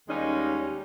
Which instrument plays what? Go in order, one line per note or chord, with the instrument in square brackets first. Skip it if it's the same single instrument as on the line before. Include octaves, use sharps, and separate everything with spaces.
[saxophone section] D#2 G3 G#3 C#4 D#4